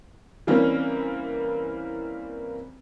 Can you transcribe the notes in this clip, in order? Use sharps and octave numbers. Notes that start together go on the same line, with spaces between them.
E3 G3 A#3 C4 C#4